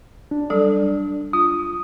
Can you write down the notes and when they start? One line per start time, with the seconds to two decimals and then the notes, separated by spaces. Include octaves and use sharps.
0.31 D4
0.50 F#3 G3 A4
1.33 F4 D#6